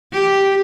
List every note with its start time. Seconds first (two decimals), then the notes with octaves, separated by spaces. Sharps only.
0.13 G4